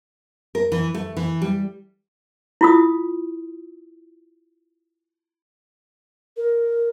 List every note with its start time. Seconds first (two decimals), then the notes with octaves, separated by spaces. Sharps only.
0.55 A#4
0.72 E3
0.95 A3
1.17 E3
1.42 G3
2.61 E4 F4 D#6
6.37 A#4